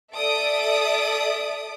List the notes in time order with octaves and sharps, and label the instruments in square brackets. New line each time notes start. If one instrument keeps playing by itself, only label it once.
[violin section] A4 D5 E5 D#6 D7